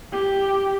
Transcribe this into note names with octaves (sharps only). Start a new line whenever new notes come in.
G4